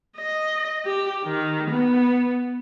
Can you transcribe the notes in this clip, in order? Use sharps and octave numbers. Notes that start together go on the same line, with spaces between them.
D#5
G4
D#3
B3